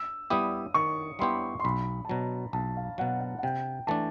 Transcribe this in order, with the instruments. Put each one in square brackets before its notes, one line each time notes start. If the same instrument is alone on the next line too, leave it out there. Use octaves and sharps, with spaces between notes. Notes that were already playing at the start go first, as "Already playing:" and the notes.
Already playing: [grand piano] E6
[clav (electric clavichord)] G3 B3 E4 G4 [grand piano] D#6
[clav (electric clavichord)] D#3 [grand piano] C#6
[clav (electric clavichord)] G3 B3 E4 G4 [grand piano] C6
[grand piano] C6
[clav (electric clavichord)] B1 [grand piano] B5
[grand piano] A5
[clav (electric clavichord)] B2 F#3 [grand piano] A#5
[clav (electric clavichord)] B1 [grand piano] A5
[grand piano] F5
[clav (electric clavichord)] B2 F#3 [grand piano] F#5
[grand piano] F#5
F#5
[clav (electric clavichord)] C3 [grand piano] G5
[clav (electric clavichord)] E3 A3 D4 [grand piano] A5